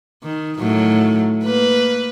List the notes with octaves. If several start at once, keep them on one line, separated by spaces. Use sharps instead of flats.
D#3
A2 D#3 F#3
A#3 B4